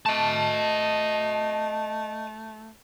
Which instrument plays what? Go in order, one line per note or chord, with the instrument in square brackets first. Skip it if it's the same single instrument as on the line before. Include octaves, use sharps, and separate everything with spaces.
[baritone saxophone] A3 [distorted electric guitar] D#5 A5